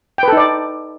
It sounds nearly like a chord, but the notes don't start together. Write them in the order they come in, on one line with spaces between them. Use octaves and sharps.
G5 B4 A4 D#4 D5